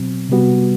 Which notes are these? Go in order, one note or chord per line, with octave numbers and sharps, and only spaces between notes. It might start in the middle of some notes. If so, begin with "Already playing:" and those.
Already playing: B2 F#3 C4
C3 G3 B3 F#4